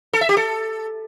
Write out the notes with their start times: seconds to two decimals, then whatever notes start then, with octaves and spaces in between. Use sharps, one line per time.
0.13 A4
0.21 E5
0.29 G4
0.37 A4